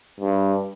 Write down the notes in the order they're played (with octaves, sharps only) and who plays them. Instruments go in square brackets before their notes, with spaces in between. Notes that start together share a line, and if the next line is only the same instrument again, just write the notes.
[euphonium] G2